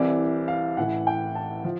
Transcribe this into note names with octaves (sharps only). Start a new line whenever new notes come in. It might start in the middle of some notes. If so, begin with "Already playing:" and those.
Already playing: C2 C3 E3 D5
F5
A1 A2 E3 F#5
G5
A5
F3